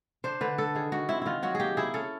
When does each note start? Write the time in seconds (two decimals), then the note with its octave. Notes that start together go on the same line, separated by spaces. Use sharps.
0.24 D4 C5
0.41 D3 B4
0.58 D4 A4
0.75 D#3 G#4
0.92 D#3 F#4
1.09 C4 E4
1.22 D#3 E4 F4
1.43 F#3 F#4
1.55 A#3 G4 G#4
1.77 E4 G#4
1.94 C#4 A4